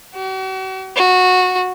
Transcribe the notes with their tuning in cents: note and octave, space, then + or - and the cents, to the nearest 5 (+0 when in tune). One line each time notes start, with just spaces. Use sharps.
F#4 +45
F#4 -15